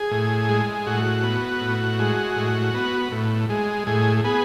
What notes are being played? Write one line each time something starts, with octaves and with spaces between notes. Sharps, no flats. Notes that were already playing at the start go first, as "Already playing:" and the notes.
Already playing: G#4
A2
G#3
A2 F#4
B3
A2
G#3
A2
B3
A2
G#3
A2 G#4
B3 G#4